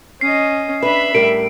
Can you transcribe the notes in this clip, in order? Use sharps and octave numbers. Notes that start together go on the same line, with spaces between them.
C#4 D#5 C7
D4 B4 E5 B5
A2 G3 A#4 D7